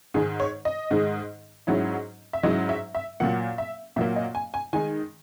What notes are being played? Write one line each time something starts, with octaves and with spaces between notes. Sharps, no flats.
G#2 D#3 G#3 G#4
C#5
D#5
G#2 D#3 G#3
G#2 F#3 C#4 E4
E5
G#2 F#3 C#4 E4 D#5
E5
E5
A#2 F#3 A#3 F#5
E5
A#2 F#3 A#3 E5
D#5
G#5
G#5
D#3 G#3 D#4 G#5